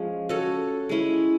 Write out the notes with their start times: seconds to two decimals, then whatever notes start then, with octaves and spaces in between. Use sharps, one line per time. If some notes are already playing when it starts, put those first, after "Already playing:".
Already playing: F3 G#3 C#4
0.29 C#4 F#4 A4 C#5
0.89 G#3 C#4 E4